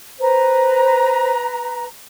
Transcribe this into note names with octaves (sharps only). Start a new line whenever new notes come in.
B4 C5 A#5